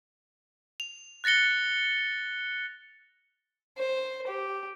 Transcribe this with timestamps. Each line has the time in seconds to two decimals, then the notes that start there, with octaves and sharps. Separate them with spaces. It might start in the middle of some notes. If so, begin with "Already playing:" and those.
0.80 F7
1.24 F#6 A6 A#6 C#7 G7
3.78 C5
4.28 G4